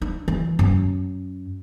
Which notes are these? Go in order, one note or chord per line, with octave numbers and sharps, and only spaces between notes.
D4
E3
F#2